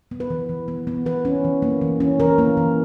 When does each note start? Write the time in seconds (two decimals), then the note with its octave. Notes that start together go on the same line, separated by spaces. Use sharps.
0.11 B3
0.20 B4
0.30 E3
0.49 E3
0.68 B3
0.87 B3
1.06 E3 B4
1.25 C#4
1.44 E3
1.62 A#3
1.81 E3
2.00 C#4
2.20 E3 A#4
2.38 A#3
2.57 E3